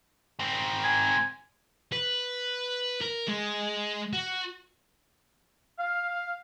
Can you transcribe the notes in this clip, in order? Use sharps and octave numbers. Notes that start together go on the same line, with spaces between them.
G#2 C4
G#5
B4
A#4
G#3
F#4
F5